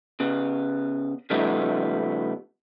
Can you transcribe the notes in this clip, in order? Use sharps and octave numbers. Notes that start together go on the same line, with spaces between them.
C#3 B3
C#3 F3 G3 A3 B3 D#4